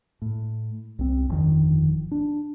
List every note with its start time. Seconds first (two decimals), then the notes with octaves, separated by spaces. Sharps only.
0.22 A2
0.99 C2 C4
1.29 G1 F2 D3 D#3
2.12 D4